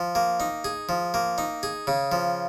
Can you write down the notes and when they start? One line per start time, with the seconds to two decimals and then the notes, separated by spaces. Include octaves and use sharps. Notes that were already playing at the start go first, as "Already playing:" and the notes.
Already playing: F3
0.15 A#3
0.40 D#4
0.65 G#4
0.89 F3
1.14 A#3
1.38 D#4
1.63 G#4
1.87 C#3
2.12 F3